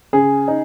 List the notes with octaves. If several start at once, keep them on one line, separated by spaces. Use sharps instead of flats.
C#3 G#4
D#4